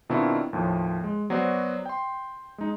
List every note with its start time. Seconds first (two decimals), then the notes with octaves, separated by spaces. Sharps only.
0.09 B2 D#3 C4 D4 E4 F4
0.53 D#2 A2 F3
1.04 G#3
1.30 F#3 B3 F#4 C5 D5
1.86 G5 C6
2.58 G#3 D#4